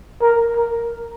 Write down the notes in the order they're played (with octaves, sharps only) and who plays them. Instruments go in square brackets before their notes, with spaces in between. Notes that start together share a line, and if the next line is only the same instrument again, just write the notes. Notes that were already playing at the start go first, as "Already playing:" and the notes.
[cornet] A#4
A#4